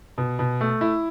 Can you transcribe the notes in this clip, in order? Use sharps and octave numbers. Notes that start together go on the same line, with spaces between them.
B2
B2
A3
E4